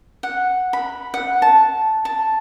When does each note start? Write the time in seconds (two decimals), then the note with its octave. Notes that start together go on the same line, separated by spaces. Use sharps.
0.23 F#5
0.73 B5
1.14 F#5
1.42 A5
2.05 A5